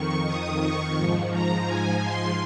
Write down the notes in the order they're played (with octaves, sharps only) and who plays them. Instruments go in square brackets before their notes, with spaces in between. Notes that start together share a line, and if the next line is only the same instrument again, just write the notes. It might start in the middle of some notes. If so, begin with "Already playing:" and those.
Already playing: [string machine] F2 D#3 C#6
D#6
C#6
G#2 F3
A#5
G#5
C6